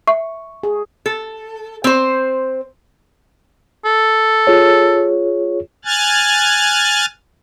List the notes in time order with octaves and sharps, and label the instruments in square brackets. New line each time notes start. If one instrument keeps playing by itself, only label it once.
[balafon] E5 [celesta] C#6
[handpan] G#4
[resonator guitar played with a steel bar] A4
C4 C5
[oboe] A4
[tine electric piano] F4 G#4 C#5
[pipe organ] G#5 F6 F#6 G#6 A6